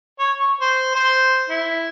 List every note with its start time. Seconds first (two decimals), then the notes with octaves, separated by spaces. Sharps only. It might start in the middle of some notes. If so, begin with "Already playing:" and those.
0.19 C#5
0.38 C#6
0.61 C5
0.95 C5
1.49 E4